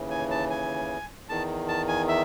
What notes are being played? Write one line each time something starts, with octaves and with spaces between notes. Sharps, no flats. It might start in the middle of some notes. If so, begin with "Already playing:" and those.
Already playing: D#2 C#3 E3
G#5
A5
G#5
E2 D#3 A5
A5
G#5
E5